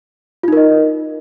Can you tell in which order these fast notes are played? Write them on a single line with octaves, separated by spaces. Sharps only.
F4 D#4 A#4 D#5